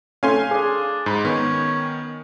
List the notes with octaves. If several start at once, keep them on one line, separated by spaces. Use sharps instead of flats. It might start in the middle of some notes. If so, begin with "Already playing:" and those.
A3 C#4 F5 G#5 C6
D4 G#4
G#2 B5
D#3 B3 C#4